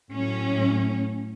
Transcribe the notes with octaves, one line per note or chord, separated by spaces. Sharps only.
A2 F#3 C#4